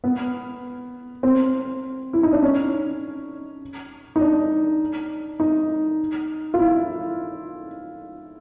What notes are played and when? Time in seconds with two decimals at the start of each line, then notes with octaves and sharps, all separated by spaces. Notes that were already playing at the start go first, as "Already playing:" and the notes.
0.04 B3
1.23 C4
2.13 E4
2.23 D#4
2.33 D4
2.42 C#4
4.16 D#4
4.21 D4
5.40 D#4
6.54 F4
6.59 E4